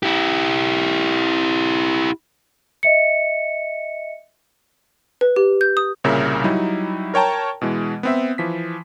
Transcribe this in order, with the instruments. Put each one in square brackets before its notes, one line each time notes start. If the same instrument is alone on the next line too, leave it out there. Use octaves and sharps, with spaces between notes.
[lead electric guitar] E4 G4
[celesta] D#5 E5 C#7
[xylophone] B4
G4
G6
D#6
[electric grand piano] C2 A#2 C#3 A#4 E5
F#3 G3 D#4 E4
A#4 C#5 G5 A5 A#5
B2 E3 G#3
B3 C4 E5
E3 F3 B6